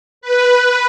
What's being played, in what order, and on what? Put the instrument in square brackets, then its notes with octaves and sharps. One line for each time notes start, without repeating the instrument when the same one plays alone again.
[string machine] B4